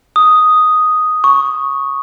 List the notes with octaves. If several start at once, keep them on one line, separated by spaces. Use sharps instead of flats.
D#6
C#6